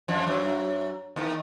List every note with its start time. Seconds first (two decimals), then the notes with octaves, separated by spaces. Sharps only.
0.08 F2 F3
0.27 F#2 F#3
1.16 D#2 D#3